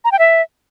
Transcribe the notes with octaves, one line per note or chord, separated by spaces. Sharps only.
A#5
G5
E5